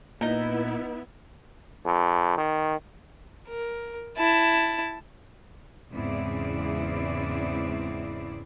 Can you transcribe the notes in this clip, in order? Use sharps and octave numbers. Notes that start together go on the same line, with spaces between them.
A#2 B3 D#4 E4 A#5
F2
D#3
A#4
E4 A5
E2 G#2 C#3 C4 E4 D5